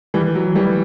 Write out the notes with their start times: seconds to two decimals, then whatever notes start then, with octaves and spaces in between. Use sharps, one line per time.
0.14 E3 G3
0.35 F#3
0.55 E3 G3